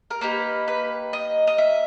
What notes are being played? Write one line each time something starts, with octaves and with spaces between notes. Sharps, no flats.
A#4
A#3 D#4 G4 B4
B4
D#5
D#5
E5